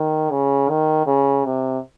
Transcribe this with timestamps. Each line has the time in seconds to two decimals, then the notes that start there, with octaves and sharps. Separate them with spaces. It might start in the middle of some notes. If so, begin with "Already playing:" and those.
Already playing: D#3
0.31 C#3
0.69 D#3
1.06 C#3
1.45 C3